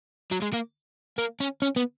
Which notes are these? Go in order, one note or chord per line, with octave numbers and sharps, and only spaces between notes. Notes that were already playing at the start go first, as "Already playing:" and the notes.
F#3
G#3
A#3
A#3
C#4
C#4
B3